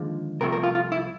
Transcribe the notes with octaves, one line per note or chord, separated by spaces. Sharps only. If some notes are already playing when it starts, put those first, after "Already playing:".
Already playing: D#2 D3 F3 G#3
C2 C3 F3 A3 A#4
A#4
F4
F4
E4